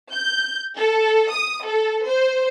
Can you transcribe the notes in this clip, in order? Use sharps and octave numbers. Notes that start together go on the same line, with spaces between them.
G6
A4
D#6
A4
C5